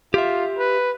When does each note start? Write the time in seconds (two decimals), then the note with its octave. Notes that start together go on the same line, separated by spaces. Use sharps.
0.14 F4 G4 E5
0.58 B4